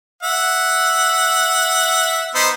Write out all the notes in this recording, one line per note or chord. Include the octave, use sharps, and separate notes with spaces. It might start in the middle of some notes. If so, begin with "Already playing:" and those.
E5 F#5
B3 D#4 C5